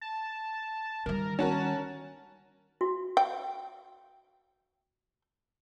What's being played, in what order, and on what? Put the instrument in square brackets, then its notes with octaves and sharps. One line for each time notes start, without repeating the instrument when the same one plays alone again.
[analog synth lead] A5
[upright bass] D#3 G3 [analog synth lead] A#4
[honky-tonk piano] C#4 F#4 A#4 [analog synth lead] A5
[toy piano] F#4
[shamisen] G5